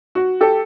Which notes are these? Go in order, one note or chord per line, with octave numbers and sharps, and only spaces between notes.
F#4
G4 A4